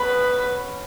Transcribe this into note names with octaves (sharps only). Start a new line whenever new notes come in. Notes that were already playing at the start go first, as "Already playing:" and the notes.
Already playing: B3 C#4 B4